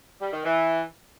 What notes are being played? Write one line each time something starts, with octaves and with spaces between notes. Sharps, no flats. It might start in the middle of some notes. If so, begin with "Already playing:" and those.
G3
D#3
E3